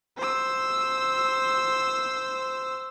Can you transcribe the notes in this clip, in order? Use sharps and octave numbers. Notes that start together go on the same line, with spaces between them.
C5 E6